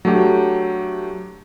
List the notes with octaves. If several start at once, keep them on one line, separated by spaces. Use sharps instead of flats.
F#3 A3 D4 G4